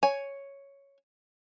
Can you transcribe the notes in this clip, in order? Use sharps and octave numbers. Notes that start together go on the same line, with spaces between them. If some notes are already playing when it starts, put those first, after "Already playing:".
C#5 G#5